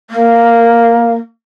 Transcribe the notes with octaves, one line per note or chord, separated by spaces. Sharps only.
A#3